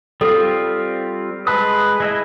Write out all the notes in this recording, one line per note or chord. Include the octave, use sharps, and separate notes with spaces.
G3 C4 F4 A4
G#3 B4 A5 D#6
G#3 E4 D#5